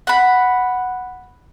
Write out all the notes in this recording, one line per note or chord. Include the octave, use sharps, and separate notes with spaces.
F#5 B5